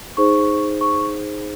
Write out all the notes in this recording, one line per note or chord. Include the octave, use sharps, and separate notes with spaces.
D#4 G#4 C5 C#6
C#6